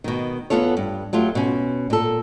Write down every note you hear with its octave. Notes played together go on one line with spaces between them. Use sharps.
B2 D#3
E2 A#2 B3 F4 A4 C#5
G2
F#3 A3 F4 G4
B2 C#4
A#2 A4